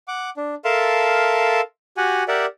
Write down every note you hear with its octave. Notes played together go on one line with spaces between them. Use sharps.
F#5 D6
D4
A4 A#4 E5 F5 A5 C6
F#4 G4 F#5 G#5
G4 A#4 D5 E5 F#5